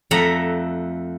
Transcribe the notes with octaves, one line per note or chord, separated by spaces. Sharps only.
F2 A3 E5 F#5 A#5